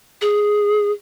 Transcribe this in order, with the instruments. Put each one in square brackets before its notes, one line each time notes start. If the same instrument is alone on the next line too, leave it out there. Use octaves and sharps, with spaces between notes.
[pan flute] G#4